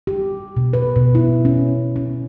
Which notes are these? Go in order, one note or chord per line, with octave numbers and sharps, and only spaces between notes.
G4
B2
B4
B2
E4
C#4
C#4